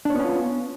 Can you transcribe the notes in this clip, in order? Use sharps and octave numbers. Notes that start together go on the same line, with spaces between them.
B3 C#4 D4 F4 C#5